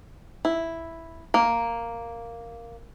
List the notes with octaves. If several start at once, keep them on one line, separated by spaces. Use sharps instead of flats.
E4
A#3